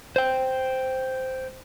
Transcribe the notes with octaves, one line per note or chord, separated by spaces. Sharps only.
C5 G5